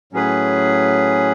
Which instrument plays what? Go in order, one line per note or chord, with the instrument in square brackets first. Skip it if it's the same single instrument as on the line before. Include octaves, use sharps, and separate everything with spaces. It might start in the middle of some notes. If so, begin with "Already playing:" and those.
[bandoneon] A2 F#3 C#4 G#4 B4